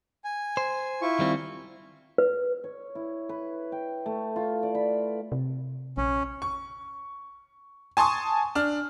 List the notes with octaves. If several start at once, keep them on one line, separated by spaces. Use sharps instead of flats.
G#5
C5
E4 F4 C#6
D#3 G3 C4
B4
C#5
E4
B4
G5
A3
F4
D5
B5
C3
A#1 C#4
C#6
G#5 A5 C6 C#6 D#6
D4 F6